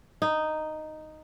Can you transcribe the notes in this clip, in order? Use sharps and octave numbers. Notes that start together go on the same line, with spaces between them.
D#4